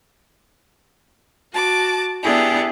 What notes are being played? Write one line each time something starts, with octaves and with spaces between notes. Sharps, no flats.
F#4 A5 D6
B3 D4 E4 G4 G#4